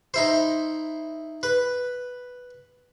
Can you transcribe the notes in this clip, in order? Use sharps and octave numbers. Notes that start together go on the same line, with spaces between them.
D#4 E4 C5
B4